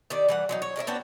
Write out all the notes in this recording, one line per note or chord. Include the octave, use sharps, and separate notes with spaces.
D#3 G4 D5
E3 G3 F#5
F#3 C4 D#4
C#5
C#4 A#4 D5 E5
B3 C4 D4 F#4